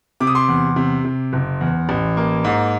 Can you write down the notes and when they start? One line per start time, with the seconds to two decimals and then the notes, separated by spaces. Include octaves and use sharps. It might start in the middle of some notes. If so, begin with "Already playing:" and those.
0.20 C3 D6
0.27 D#6
0.35 C6 D6
0.48 E2
0.76 C3
1.04 C3
1.33 F#1
1.61 E2
1.89 A1
2.17 A#3
2.44 G#2